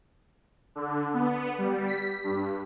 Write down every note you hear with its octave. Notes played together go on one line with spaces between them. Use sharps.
D3
B3
G3
B6
G2